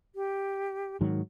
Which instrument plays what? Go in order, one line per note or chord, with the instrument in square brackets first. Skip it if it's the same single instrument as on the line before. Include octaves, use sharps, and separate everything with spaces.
[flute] G4
[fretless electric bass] G#2 D#3 F#3